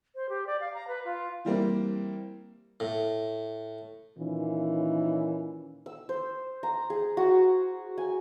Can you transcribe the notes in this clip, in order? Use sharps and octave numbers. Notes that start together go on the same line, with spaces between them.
C5
G4
D5
F5
A#5
B4
F4
E3 G3 A#3 C4
A2
A#2 D#3 E3 C#4 D#4 F4
E6
C5
A#5
G#4
F#4
G#5